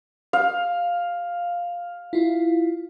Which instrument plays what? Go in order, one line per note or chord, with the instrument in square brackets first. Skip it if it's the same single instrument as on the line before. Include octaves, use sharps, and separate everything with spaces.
[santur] F5
[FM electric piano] E4 F4